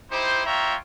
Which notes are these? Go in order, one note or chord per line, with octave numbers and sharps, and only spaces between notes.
D#4 E4 G4 C5
A#3 F4 C#5 E5 G5 A#5